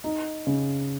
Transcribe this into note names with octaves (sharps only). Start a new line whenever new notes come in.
D#4
C#3